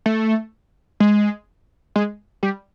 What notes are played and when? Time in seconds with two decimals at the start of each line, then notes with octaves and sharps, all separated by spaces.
0.06 A3
1.00 G#3
1.96 G#3
2.43 G3